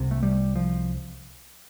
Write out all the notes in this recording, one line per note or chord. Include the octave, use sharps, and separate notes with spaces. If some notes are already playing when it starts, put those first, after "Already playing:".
Already playing: C2 C3
A3
G3
F3